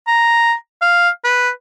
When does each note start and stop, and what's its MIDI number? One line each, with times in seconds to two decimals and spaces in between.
0.07 0.53 82
0.81 1.10 77
1.24 1.49 71